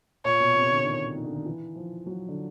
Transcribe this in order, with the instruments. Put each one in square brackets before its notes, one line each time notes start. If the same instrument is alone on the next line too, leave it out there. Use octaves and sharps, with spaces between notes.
[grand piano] A#2 [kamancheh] C#5
[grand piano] B2
C3
D3
D#3
D#3
D3
D#3
E3
F3
F#3
D3